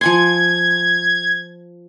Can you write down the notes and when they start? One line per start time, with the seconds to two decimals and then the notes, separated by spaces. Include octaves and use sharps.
0.01 F3 G#5 C6 G#6